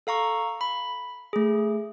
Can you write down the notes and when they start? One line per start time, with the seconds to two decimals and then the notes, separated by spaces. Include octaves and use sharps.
0.07 A4 F5 A#5 C#6
0.61 B5
1.33 A3 G#4